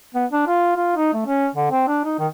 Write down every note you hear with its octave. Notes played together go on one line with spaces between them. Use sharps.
B3
D4
F4
F4
D#4
A3
C#4
D3
C4
D4
D#4
D#3